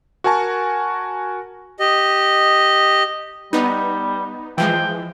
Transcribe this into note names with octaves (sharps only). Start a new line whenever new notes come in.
F#4 A#4 G#5 A5 C#6
G4 D#5
G3 B3 D#4
E3 F3 G#3 G5